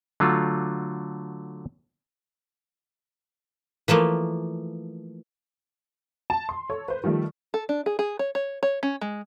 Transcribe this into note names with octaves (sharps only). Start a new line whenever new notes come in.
D3 F#3 A3 F4
E3 F3 A3 A#3
A5
C6
A4 C#5
B4 C5
D#3 F3 G3 A3
A4
D4
G#4
G#4
C#5
C#5
C#5
C#4
G#3